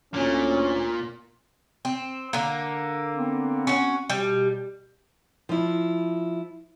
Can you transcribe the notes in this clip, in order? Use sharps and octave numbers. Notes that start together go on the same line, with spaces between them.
D2 A#2 C#4
C4
D3 A#3
B3 C4
C#4 F#4
B2 G3
F3 E4